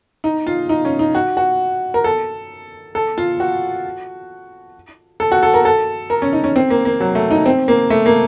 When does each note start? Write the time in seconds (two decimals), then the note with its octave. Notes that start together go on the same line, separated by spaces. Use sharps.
0.24 D#4
0.47 F4
0.69 D#4
0.85 C#4
0.99 D#4
1.15 F#4
1.37 F#4
1.94 A#4
2.04 A4
2.95 A4
3.18 F4
3.40 F#4
5.20 A4
5.32 F#4
5.43 A4
5.54 A#4
5.65 A4
6.10 A#4
6.22 C#4
6.33 D#4
6.44 C#4
6.56 C4
6.70 A#3
6.85 A#3
7.00 F#3
7.15 A3
7.31 D#4
7.46 C4
7.68 A#3
7.90 A3
8.06 A#3